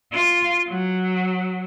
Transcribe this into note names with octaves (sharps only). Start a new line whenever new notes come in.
F4
F#3